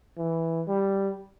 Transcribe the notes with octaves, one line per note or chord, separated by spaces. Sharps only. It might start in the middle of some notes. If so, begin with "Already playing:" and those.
E3
G3